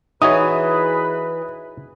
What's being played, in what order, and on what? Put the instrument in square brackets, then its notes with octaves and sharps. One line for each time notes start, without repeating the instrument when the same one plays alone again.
[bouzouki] E3 [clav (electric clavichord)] D#4 F#4 C#5 [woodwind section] G#4 B4 [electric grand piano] D#6